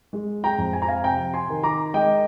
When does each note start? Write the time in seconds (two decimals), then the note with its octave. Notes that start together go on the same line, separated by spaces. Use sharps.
0.13 G#3
0.44 G5 A#5
0.58 F2
0.73 G#5
0.82 A#5
0.88 F5 G#5
1.04 C3 G5 A#5
1.33 G#5 C6
1.49 D#3
1.63 A#5 D6
1.94 G#3 D#5 G5